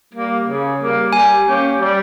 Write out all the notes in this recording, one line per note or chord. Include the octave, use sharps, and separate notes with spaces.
G3 A#3
C#3
G3 A#3
G3 G#5
A#3 C#4 G4
G3